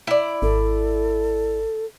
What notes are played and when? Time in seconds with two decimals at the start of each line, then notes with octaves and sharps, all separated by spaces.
0.07 E4 D5
0.42 G#1 A4